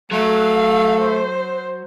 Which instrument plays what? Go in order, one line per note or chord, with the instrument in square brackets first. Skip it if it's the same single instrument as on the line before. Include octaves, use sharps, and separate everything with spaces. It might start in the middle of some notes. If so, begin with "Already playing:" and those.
[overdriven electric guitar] F#3 [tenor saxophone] A3 [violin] F5
[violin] C5